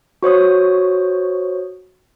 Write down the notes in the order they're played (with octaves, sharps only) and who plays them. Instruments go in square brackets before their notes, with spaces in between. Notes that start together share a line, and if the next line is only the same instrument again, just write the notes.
[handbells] F#4 C5 C#5 D#6